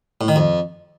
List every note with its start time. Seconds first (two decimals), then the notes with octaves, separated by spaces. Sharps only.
0.21 A2
0.28 D#3
0.36 F2